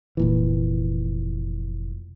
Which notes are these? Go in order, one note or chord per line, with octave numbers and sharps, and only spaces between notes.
F1 A#2 E3